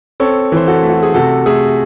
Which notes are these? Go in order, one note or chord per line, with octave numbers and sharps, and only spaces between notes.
C4 A4 C#5
E3 C5
F#4 A4
A3
F#4
G#4
C3 F#4 A4
A3 G#4